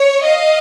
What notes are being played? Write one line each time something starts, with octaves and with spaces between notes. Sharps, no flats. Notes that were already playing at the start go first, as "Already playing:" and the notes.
Already playing: C#5
D#5 F5